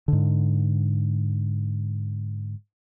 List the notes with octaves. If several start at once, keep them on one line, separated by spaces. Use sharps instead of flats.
G#2 D3